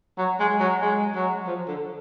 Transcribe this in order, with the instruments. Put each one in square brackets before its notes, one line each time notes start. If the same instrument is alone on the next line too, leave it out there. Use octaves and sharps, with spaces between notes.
[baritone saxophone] F#3
G#3
F#3
G#3
F#3
F3
D3